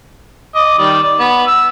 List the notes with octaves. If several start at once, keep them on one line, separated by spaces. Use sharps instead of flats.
D#5 D6
D#3 G3 D5
D5
B3
E6